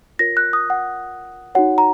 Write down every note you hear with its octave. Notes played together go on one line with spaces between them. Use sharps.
F4 A#4 C#5 A#6
F#6
D#6
F#5
D#4 F#4 C#5 F#5
A#5